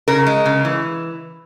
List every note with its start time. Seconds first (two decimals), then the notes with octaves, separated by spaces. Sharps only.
0.08 C#3 A#4
0.27 G#3
0.46 C#3
0.65 E3